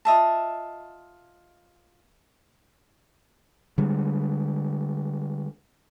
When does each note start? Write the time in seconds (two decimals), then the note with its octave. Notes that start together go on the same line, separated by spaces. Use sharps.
0.05 F4 D#5 E5 A5
3.78 D3 G3 G#3